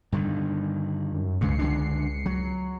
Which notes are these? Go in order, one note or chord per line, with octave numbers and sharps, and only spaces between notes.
G2 D3 D#3
F#2
C#2 G2 C#3 G#3 C7 C#7
D3 G#3 D4
F#3